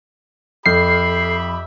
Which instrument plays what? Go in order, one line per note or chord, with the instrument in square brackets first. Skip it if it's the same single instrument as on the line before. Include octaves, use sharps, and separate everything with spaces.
[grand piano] F2 F6 [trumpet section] G4 E5 B5 [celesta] A4 G6 [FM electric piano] C7